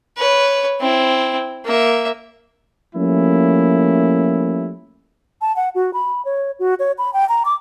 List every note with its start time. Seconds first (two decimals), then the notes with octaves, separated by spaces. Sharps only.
0.17 B4 C#5
0.81 C4 E4
1.65 A#3 E5
2.96 F3 G3 A3 A#3 C#4 E4
5.41 A5
5.56 F#5
5.75 F#4
5.94 B5
6.25 C#5
6.59 F#4
6.79 C#5
6.98 B5
7.13 G5
7.29 A#5
7.45 D6